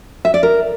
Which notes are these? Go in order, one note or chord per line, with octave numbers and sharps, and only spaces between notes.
E5
D5
A#4